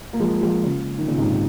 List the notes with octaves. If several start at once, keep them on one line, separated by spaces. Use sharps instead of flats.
A#3
F3 G#3
F3 G#3
C#3 F3
D#3
A#2 C#3
G#2 C3